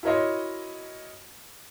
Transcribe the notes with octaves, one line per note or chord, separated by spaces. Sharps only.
E4 F#4 A#4 C#5 D#5 C6